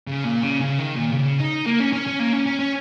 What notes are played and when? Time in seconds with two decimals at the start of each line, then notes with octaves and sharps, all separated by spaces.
0.08 C#3
0.24 A#2
0.43 C#3
0.61 C#3
0.79 D#3
0.96 A#2
1.13 C#3
1.40 D#4
1.66 A#3
1.80 C#4
1.93 C#4
2.07 C#4
2.19 A#3
2.33 C#4
2.46 C#4
2.59 C#4